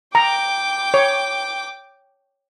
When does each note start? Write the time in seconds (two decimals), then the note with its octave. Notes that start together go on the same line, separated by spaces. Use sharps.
0.15 G5 A#5 D6
0.94 C#5